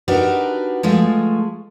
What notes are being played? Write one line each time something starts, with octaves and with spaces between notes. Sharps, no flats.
D4 D#4 F#4 G4 A#4 B4
F3 G#3 A3